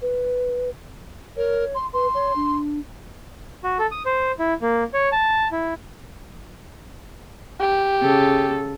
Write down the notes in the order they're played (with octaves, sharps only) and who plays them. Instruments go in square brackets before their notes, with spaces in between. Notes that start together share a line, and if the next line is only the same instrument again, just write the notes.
[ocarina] B4
[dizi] A#4 [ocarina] C#5
[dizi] C6
[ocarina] B4 [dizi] C6
[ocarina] C#5
D4
[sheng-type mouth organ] F#4
A4
D#6
C5
E4
A#3
C#5
A5
E4
[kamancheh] G4
[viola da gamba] C#3 A4